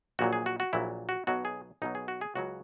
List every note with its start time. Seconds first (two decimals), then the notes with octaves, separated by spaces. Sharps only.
0.19 A#1 A#2 F#3 F#4
0.33 G#4
0.46 F#4
0.60 F#4
0.73 A#1 A#2 F#3 E4
1.09 F#4
1.27 B1 B2 F#3 F#4
1.45 G#4
1.82 B1 B2 F#3 D#4
1.95 G#4
2.08 F#4
2.21 G#4
2.35 C#2 C#3 F#3 F#4